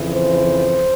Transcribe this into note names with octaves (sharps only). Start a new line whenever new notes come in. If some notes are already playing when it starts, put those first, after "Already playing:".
Already playing: F2 C#3 E3
C5